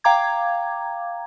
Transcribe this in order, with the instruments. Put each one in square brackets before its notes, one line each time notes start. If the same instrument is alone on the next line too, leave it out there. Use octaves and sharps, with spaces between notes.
[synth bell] F5 G5 A#5 D6 G#6